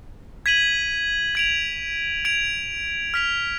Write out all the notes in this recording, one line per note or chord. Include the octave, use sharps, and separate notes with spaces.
G#6 B6 D#7 F#7
G#6 D7 F7
G#6 D7 F7
F6 B6 F7